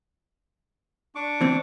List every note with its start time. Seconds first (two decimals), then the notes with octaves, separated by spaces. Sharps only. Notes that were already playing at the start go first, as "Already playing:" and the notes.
1.15 D4 C#6 D6
1.41 E3 C4